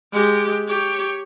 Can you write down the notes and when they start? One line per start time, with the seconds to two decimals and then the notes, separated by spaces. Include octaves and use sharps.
0.13 G#3 G4
0.67 G4 C#5